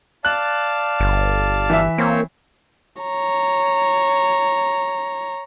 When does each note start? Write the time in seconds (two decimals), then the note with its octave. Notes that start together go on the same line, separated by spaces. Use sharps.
0.25 D5 F5 A5 F#6
1.00 G1
1.70 E3 E5
1.98 A#3 C4 C5 C#5
3.02 C#5 A#5